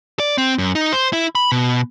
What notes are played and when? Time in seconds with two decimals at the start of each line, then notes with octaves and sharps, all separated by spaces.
0.20 D5
0.38 C4
0.58 F#2
0.75 D#4
0.93 C5
1.13 E4
1.35 B5
1.52 B2